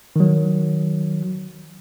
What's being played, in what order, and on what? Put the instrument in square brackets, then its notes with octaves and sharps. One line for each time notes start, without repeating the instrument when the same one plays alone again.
[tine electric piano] D#3 F#3